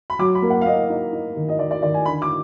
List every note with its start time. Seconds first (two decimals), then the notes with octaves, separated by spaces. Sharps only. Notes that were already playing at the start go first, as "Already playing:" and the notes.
0.10 B5
0.19 F#3 D6
0.35 B5
0.42 A#3
0.50 F#5
0.61 F5
0.66 A#3 D#5
0.90 D#4
1.13 D#4
1.36 D#3
1.49 D#5
1.59 D#3 D5
1.71 D5
1.82 D#3 D5
1.94 G#5
2.05 D3 B5
2.22 D6